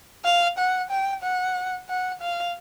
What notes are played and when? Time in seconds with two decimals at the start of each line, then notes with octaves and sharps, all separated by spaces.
0.25 F5
0.58 F#5
0.90 G5
1.23 F#5
1.89 F#5
2.21 F5